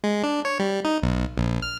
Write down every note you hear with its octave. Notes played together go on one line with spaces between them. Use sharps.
G#3
D4
C#5
G3
D#4
B1
A#1
F6